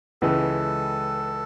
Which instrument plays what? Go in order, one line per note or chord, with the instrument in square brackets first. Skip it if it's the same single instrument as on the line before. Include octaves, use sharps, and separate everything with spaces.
[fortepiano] C#2 C#3 E3 G#3 [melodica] A4